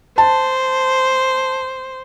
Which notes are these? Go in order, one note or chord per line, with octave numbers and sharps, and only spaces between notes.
C5 A5